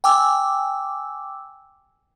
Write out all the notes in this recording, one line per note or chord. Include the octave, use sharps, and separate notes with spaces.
G5 G#5 D6 E6